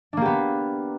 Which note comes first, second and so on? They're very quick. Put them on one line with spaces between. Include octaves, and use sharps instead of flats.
D4 A#3 G4 B3